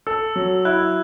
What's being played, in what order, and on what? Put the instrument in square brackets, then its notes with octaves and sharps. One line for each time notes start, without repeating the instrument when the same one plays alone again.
[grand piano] A4 [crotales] E6
[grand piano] F#3
[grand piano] E4 [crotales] F#6